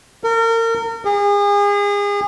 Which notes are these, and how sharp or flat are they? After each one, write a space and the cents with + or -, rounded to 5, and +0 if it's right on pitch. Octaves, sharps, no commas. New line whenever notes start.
A#4 -35
G#4 -35